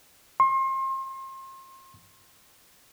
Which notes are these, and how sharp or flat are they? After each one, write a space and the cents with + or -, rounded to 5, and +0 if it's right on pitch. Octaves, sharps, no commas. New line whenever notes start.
C6 +35